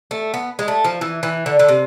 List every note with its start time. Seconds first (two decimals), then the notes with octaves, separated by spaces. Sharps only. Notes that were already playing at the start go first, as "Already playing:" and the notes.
0.11 A3
0.34 B3
0.59 G#3
0.68 A3
0.84 F3
1.01 E3
1.23 E3
1.46 D3
1.59 D3
1.68 C3